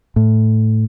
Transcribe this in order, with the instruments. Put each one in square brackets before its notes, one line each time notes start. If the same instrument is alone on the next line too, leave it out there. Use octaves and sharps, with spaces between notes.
[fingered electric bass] A2